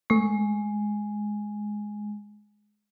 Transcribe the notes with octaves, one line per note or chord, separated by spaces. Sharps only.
G#3 A3 C#6